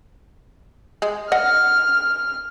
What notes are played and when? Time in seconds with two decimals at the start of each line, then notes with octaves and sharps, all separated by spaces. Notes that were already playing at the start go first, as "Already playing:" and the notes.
1.02 G#3
1.32 D#5 F#5 F6